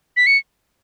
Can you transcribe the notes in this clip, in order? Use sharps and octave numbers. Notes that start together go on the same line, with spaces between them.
B6
C#7